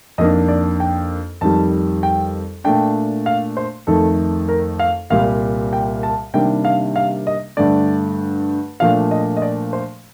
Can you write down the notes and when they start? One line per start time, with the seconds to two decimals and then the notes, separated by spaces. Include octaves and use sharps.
0.18 F2 D#3 A#3 D4 D#5
0.48 D5
0.80 G5
1.41 F2 D#3 G3 A5
2.03 G5
2.64 A#2 A3 D4 G5
3.26 F5
3.57 C5
3.87 F2 D#3 A3 A4
4.49 A#4
4.79 F5
5.10 C2 A#2 G3 F5
5.73 G5
6.03 A5
6.34 C3 D#3 G3 A#3 D4 G5
6.65 F5
6.96 F5
7.27 D#5
7.57 G2 D3 A3 D5
8.80 A#2 F3 A3 D4 F5
9.11 D#5
9.37 D#5
9.42 D5
9.73 C5